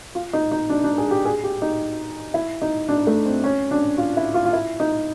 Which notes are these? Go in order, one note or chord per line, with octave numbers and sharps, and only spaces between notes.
F4
D#4
D#4
D4
D4
G#4
G4
G#4
G4
D#4
E4
D#4
D4
A3
C4
C#4
D4
F4
E4
F4
F4
E4
D#4